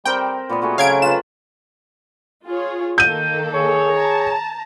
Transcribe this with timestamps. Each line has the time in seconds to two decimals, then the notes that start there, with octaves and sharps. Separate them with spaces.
0.05 G3 C4 A#4 G5
0.50 A#2 B3 D#5
0.62 A3 B3 F#4 G#4
0.78 C#3 F#3 F5 G#6 D7
1.02 F4 B4 E7
2.46 F4 G#4 C#5
2.98 D#3 A#3 A4 G6 D#7
3.53 G#4 C#5
3.95 A5 A#5